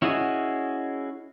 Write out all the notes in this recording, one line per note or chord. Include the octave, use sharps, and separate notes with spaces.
C#4 E4 F#4 G#4 D#5